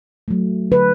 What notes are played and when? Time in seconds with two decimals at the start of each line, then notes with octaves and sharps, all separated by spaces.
0.28 F#3 A3
0.71 D3 B4